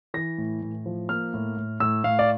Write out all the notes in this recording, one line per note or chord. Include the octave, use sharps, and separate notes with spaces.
E3 A#6
A2
A2
F3
A#3 F6
A2
A2
A2 E6
A2 F5
D5